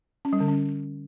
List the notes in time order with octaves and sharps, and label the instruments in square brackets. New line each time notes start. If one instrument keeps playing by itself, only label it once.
[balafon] C#4
G3
D3
C#4